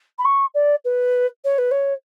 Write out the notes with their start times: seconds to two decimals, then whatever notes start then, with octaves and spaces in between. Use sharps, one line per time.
0.18 B5
0.24 C#6
0.54 D5
0.84 B4
1.44 C#5
1.58 B4
1.71 C#5